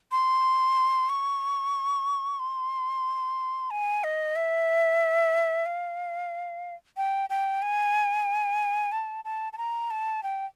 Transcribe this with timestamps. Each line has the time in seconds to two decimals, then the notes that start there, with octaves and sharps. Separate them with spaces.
0.12 C6
1.09 C#6
2.39 C6
3.71 G#5
4.04 D#5
4.36 E5
5.66 F5
6.97 G5
7.30 G5
7.62 G#5
8.92 A5
9.25 A5
9.53 A5
9.58 A#5
9.90 A5
10.23 G5